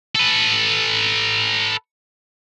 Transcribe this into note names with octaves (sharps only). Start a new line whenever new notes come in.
A4 B4